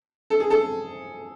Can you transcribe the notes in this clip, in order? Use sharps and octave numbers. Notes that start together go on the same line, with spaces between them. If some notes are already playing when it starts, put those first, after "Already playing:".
A4
G#4
A4